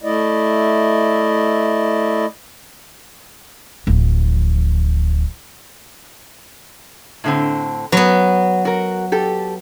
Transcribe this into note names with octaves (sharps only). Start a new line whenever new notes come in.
A3 E4 D5 D#5
D1 F3
A2 D3 C4
F#3 B3 B4
F#4 A#4
G4 A4